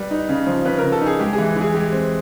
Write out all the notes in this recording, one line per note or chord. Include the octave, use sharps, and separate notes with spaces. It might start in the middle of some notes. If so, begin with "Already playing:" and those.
Already playing: G3 B4
D#4
C#3
F3
C#3 B4
C#3 A#4
A4
D#4 G#4
G#3 G4
E3 G#4
E3 G#4
G#3 G4
C4